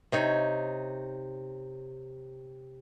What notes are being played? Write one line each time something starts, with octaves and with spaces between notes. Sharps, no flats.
C3 D#4 C#5